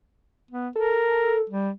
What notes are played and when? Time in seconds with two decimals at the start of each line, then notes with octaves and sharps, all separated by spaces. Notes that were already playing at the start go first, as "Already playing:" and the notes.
0.51 B3
0.76 A4 A#4
1.50 G3